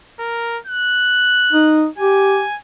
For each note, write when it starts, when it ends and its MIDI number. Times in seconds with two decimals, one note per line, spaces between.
0.19 0.58 70
0.67 1.88 90
1.52 1.86 63
1.98 2.44 67
1.98 2.57 80